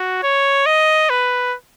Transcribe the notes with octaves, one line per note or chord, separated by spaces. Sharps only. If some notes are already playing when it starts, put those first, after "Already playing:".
Already playing: F#4
C#5
D#5
B4